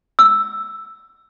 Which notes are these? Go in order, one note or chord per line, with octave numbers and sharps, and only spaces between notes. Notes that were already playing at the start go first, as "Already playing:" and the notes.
E6